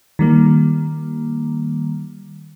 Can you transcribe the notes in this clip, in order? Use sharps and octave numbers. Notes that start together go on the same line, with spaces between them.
D#3 G3 A#3